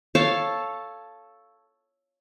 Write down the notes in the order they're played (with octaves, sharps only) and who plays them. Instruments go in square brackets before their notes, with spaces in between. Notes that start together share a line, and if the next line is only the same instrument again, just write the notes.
[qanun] A4 C#5 F5 A5